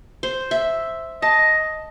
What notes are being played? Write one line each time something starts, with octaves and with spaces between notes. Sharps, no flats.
C5
E5
D#5 A5